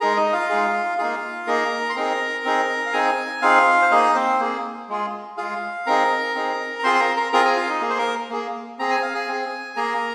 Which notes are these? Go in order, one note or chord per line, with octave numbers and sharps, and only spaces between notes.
G#3 D#4 G#4 A#4 A#5
D#4 D#5
F4 F5
G#3 D#4 G#4
A#3 D#4 F4 G#4 F5
A#3 D#4 G#4 A#4 A#5
C6
C4 D#4 G#4 A#4 A#5
C4 D#4 G#4
F5
C4 D#4 G#4 G#5
C4 D#4 F4 G#4 F5
C5
A#3 D#4 G#4 D#5
C4 C5
A#3 G#4
G#3 F4 G#4
G#3 F4 G#4 F5
C4 D#4 G#4 A#4 A#5
C4 D#4 G#4
A#5
C4 F4 G#4 C5 C6
C6
A#4 A#5
A#4 A#5
C4 F4 G#4 A#4 A#5
G#4 G#5
F4 F5
D#4 D#5
A#3 G#4
C5
A#4
A#3 G#4
C4 G#4 A#5
G#5
F5
G#4 G#5
C4 G#4
A#3 G#4 A#4 A#5